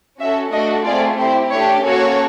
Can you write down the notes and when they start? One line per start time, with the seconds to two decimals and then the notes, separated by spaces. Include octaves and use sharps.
0.20 C#4 F#4 A4 E5
0.52 A3 D4 F#4 A4 D#5
0.86 A3 C4 F4 G#4 D5
1.19 C4 E4 G4 C5
1.52 A3 D4 G4 C#5
1.85 A#3 C#4 F#4 A4 C#5